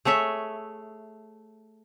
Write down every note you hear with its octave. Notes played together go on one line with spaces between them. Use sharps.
A3 G#4 C#5 E5